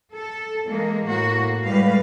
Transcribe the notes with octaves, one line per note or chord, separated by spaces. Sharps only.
A4
E3 G#3 A#3
A2 A#3 F#4
A2 G3 G#3 B4 F5